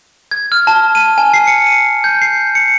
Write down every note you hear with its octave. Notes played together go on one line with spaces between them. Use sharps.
G#6
F6
A5
D#7
G#5
C7
C#7
D#7
G6
C7
C#7